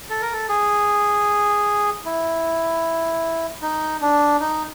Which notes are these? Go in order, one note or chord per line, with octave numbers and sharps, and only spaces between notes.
A4
A#4
A4
G#4
E4
D#4
D4
D#4